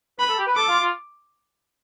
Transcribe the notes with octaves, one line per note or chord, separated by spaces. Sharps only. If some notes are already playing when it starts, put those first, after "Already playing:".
B4 B5
A4
G4
B4
A4 D6
F4
F4